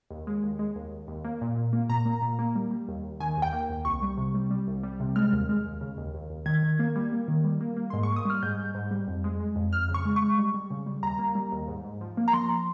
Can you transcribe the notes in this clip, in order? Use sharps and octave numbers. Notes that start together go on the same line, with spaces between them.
D#2
G#3
D#2
G#3
D#2
D#2
D#2
A#3
A#2
A#2
A#3
A#2 A#5
A#3
A#2
A#3
G3
G3
D#2
D#2
D#3 G#5
D#2
G5
A#3
D#2
C2 C#6
G3
C3
G3
G3
C2
G3
C3
G#3 F6
D#2
G#3
D#2
C#3
D#2
D#2
D#2
D#3 G#6
D#3
A#3
G3
A#3
D#3
G3
A#3
A#3
G#2 C6
C#6
A#3
D#6
G3 F6
G#2 G6
G#2
G#2
G3
F2
G#3
G#3
F2
F2 F6
C#3
C#6
G#3
C#6
G#3
G3
G3
C#3
G3
D#2 A#5
A#3
G3
D#2
G#2
G#2
F3
A#3
A#5
F3 C6